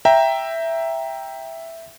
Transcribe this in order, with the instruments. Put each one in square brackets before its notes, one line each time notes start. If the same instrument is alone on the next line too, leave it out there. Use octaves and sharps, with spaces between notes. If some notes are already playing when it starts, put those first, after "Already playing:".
[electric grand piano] E5 G5 A#5